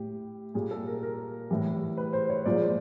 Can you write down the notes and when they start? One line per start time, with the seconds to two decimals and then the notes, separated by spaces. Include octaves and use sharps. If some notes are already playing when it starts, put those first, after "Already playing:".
Already playing: A2 G4
0.54 A#2 G3 G#4
0.71 A4
0.87 A#4
1.03 A#4
1.50 A2 E3 G3
1.97 B4
2.13 C5
2.30 C#5
2.46 A#2 F3 G#3 D5